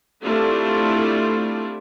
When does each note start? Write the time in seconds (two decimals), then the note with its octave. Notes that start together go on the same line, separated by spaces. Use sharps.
0.23 G3 A3 C4 D4 E4 F4